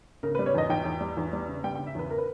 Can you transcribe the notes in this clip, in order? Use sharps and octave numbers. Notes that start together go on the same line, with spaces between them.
C#3 A#4
B4
G3
C#5
E2 D#5
E2 G5
E2
G3
E2
G3
C#3
G3 G5
G5
C#3
E5
E2 B4
A#4
B4